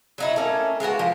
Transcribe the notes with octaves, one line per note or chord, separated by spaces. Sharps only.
F#3 D#4 E4
A3 A#3 C#4
G#3 A#3 B3 F#4
F3